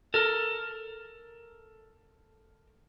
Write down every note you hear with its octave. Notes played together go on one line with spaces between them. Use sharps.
A4 A#4